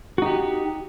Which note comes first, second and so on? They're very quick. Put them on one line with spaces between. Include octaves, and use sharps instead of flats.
F#4 D#4 G4